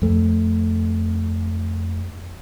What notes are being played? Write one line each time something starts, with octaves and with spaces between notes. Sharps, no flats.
F2 A3